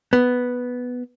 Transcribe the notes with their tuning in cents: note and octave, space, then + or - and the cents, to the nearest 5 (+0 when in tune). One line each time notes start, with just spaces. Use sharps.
B3 +0